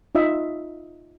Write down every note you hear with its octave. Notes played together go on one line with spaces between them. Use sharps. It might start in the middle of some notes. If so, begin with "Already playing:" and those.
D#4 F4 D#5 E5